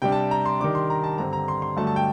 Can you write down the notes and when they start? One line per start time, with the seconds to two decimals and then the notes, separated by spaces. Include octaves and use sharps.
0.02 C3 G3 D4 G5
0.12 A5
0.31 A#5
0.45 C6
0.60 D#3 G3 D4 D6
0.75 C6
0.90 A#5
1.04 A5
1.18 G2 D3 G3 C4 A#5
1.33 A#5
1.48 C6
1.62 C6
1.77 G2 D3 F#3 A3 A5
1.87 A5
1.96 G5